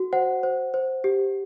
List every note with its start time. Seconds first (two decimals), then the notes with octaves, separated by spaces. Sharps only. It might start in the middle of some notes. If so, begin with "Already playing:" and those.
Already playing: F#4
0.13 C5 F#5
0.43 C5
0.74 C5
1.04 G4